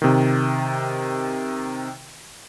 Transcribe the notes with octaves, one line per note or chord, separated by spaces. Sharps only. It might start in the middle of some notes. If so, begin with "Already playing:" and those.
C3 D#3